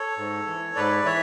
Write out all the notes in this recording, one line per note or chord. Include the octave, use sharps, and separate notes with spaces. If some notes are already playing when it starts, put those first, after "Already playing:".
Already playing: A4 C#5
G#2
E3
G#2 B4 D5
E3 C#5 E5